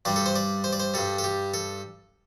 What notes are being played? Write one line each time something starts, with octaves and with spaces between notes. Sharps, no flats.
G2 G3 D5
A4
C5
D5
C5
D5
C5
G2 G3 A4
A4
G4
A4